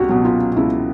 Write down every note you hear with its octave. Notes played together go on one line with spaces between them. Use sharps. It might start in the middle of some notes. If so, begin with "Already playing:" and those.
Already playing: C#2 F#4 G4
B2 F#3
F4
C#2 E4